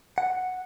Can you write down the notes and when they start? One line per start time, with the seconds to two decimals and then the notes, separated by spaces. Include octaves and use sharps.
0.18 F#5